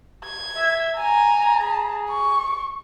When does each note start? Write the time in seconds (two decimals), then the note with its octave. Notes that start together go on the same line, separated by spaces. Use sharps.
0.24 G#6
0.56 E5
0.96 G#5 A#5
1.60 G#4
2.10 C#6